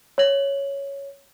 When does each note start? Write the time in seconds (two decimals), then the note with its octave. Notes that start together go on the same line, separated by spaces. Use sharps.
0.18 C#5 F#7